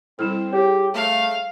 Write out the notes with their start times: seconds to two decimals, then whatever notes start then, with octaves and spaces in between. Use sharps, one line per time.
0.19 G3 C4 E4 A4 F6 E7
0.53 G4 G#4 C#5
0.94 A3 F5